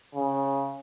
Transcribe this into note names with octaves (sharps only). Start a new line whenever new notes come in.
C#3